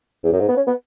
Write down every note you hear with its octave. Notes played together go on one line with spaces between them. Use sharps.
E2
F#2
G#2
B3
C#4
B3